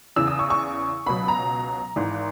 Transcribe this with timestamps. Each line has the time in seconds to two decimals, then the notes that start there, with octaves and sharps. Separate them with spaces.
0.16 E2 C#3 E3 E6
0.27 D#6
0.39 C#6
0.50 C#6
1.06 C#2 B2 F#3 B5
1.28 A#5
1.96 G#1 G#2 E3